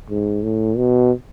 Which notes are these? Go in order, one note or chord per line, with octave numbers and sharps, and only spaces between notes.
G#2
A2
B2